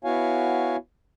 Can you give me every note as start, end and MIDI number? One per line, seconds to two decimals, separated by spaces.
0.04 0.76 59
0.04 0.76 64
0.04 0.76 66
0.04 0.76 73
0.04 0.76 77
0.04 0.76 80